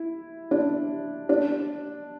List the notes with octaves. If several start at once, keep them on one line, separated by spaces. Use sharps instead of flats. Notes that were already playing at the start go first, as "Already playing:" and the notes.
Already playing: E4
D4
D4